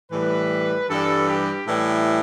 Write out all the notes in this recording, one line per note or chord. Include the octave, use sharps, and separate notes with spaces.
A2 E3 G3 B4
G2 E3 G3 A4
G4
A2 E3 G3